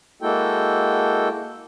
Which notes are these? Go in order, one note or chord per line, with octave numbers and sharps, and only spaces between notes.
G#3 A#3 E4 F#4 A4 G5